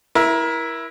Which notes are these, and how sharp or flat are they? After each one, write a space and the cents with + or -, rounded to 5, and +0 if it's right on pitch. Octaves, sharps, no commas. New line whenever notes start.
E4 +0 A#4 +30